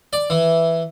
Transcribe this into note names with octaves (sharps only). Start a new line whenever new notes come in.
D5
E3